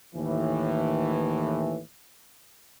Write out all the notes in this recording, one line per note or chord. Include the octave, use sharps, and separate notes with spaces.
D#2 A2 E3